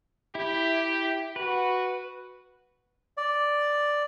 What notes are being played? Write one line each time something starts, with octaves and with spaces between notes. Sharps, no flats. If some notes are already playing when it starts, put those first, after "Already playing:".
E4 G4
F#4 B4
D5